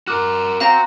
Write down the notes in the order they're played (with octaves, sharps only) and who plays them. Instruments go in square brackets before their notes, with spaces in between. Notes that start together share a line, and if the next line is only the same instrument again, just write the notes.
[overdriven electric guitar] F#4 A#4 [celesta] D6 F6 F#6
[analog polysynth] C4 [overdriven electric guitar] F#4 [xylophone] F5 A#5 A#6